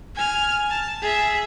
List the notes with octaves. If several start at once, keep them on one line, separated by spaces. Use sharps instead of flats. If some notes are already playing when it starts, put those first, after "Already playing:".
G#5 F6
A5
G#4 E5